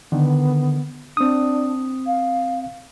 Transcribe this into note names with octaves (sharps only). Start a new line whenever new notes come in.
D3 D#3 B3
C4 D4 D#6
F5